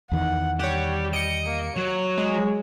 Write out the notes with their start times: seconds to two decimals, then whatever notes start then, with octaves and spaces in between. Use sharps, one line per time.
0.12 E2 D#3 F#5
0.60 G3 G4 C#5 F#5
1.13 D#5 C#7 D7
1.46 A#3
1.76 F#3 C#5
2.18 G#3